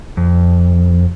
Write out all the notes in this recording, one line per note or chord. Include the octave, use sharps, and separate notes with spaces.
F2